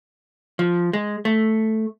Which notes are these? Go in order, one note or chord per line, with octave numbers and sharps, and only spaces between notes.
F3
G#3
A3